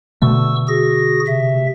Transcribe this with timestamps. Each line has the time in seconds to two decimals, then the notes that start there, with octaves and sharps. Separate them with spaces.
0.22 B2 D3 A3 C#6 E6
0.68 F#4 G#4 A#6
1.27 C3 E5